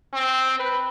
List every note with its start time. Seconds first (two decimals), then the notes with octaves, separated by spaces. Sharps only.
0.13 C4
0.59 B4